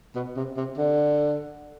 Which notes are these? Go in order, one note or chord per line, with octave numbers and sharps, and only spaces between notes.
B2
C3
C3
D3